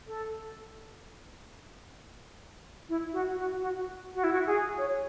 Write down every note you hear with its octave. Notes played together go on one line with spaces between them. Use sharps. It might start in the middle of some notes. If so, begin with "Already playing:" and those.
A4
E4
F#4
F#4
F#4
F#4
E4
F#4
G#4
C#5